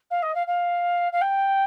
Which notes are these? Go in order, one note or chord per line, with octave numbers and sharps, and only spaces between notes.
F5
D#5
F5
F5
F5
G5